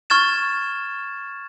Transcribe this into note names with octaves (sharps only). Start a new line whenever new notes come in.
C#6 F6 G#6 A6 E7